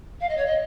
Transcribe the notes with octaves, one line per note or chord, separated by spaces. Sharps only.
F5
D#5
C#5
D#5